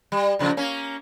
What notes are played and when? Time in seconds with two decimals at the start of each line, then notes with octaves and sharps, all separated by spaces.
0.12 G3
0.39 A#2 C#3 F3
0.57 A#3 C#4